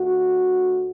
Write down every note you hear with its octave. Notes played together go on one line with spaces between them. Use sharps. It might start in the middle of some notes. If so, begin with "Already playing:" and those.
Already playing: D2 D3 A3 F#4